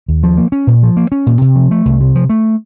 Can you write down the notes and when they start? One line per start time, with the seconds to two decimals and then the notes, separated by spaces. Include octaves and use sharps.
0.08 D#2
0.23 F3
0.37 A#3
0.52 C#4
0.67 A#2
0.83 F3
0.97 A#3
1.12 C#4
1.27 A#2
1.41 C3
1.56 F3
1.71 A3
1.85 C2
2.01 C3
2.15 F3
2.30 A3